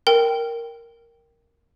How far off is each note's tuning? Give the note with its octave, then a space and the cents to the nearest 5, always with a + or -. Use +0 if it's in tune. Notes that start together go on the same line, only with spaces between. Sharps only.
A#4 +0 G5 +0